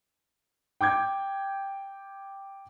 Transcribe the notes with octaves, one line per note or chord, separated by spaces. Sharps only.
G5 D6 G6 G#6